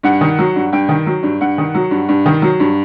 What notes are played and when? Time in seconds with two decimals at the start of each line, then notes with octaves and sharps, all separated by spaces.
0.03 G2 F#5
0.21 D#3
0.39 F#3
0.56 G2
0.72 G2 G5
0.89 D#3
1.06 F#3
1.23 G2
1.41 G2 F#5
1.58 D#3
1.74 F#3
1.91 G2
2.09 G2
2.26 D#3
2.42 F#3
2.60 G2